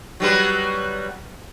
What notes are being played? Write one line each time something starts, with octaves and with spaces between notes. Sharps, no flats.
F#3 G3 B4